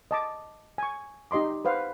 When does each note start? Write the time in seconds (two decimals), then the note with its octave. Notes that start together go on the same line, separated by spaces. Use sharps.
0.11 D#5 A5 D6
0.78 G#5 C#6
1.31 D#4 G4 D#5 C6 D6
1.65 B4 C5 F5 F#5